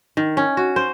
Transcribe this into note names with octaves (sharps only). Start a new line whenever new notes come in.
D#3
C#4
F#4
C5